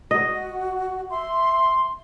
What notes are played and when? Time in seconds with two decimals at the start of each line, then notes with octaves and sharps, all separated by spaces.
0.11 F#4 D#5
1.11 E5 C6